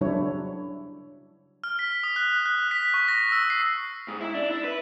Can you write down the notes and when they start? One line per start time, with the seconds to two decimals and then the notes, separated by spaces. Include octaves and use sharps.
0.01 C#3 F#3 G3 D4 E4 C#5
1.64 F6
1.79 B6
2.04 D#6
2.16 F#6
2.46 F#6
2.71 B6
2.94 C#6
3.08 A#6
3.32 E6
3.50 C7
4.08 G#2
4.21 E4
4.35 D4
4.51 E4
4.64 B4